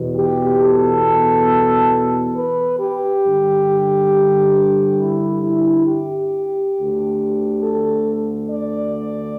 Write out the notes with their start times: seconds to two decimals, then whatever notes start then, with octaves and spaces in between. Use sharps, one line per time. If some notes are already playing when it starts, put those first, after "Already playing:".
Already playing: E2 B2
0.16 G4
0.60 A4
2.36 B4
2.80 G4
3.23 G2 D3
5.00 E4
5.44 E4
5.88 G4
6.76 D2 D3
7.63 A4
8.51 D5